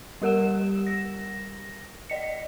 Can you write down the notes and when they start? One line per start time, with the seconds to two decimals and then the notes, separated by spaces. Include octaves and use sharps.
0.22 G3 G4 A#4 F#5 E6 E7
0.87 A#6
2.10 D5 D#5 C#7